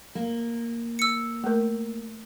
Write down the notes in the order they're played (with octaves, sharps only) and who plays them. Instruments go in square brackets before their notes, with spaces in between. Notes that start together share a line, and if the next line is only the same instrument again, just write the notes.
[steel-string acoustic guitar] A#3
[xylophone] E6 C#7
[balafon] A3 A#4